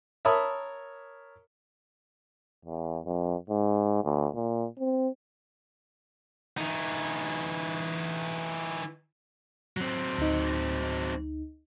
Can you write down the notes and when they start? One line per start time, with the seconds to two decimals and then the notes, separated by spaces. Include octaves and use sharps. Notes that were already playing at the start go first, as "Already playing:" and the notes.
0.25 A#4 C#5 E5 A5 B5 D#6
2.65 E2
3.06 F2
3.50 G#2
4.04 D2
4.35 A#2
4.79 C4
6.58 E3 D#4
9.77 F#3 C4
10.18 D2 D#4